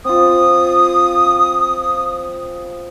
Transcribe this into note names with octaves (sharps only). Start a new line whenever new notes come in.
C4 F4 D#6